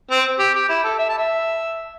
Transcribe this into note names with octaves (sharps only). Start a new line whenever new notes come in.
C4
G4
G4
E4
A4
E5
A5
E5